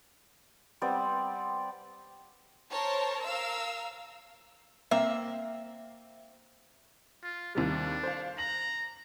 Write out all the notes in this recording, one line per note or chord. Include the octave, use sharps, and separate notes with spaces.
G3 B3 C4 D5
A#4 C5 C#5 A5
A#4 F5 E6
A#3 C4 E5
F4
D#2 C3 G3 D4
C5 F5
A#5 F#7